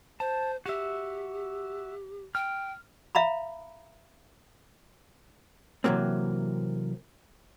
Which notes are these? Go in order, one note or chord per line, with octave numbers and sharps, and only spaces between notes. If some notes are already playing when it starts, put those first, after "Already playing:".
C5 A5
F#4 G4 E5
G5 F6
E5 F5 A#5 B5
C3 E3 F#3 A#3 C4